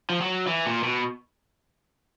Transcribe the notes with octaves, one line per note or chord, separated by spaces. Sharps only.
F3
F#3
E3
A#2
B2